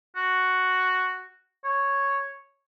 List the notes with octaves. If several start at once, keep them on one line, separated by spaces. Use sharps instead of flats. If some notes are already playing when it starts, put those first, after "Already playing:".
F#4
C#5